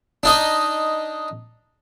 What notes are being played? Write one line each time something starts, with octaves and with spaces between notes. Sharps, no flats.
D4 D#4 D#5